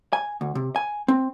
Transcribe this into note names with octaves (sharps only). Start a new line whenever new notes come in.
G#5
D2
C3
G#5
C4